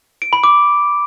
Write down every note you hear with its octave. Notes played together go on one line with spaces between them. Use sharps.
D7
B5
D6